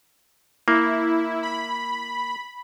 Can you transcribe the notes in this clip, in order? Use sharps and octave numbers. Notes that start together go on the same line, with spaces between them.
A#3 E4
B5